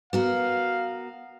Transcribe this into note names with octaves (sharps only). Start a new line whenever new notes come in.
B3 F#4 A#4 F5